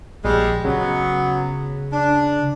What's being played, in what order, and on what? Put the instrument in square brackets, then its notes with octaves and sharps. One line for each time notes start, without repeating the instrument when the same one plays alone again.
[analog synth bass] A#1 [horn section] G3 G#3
[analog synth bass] C#3 [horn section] F#3 B3
[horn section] D4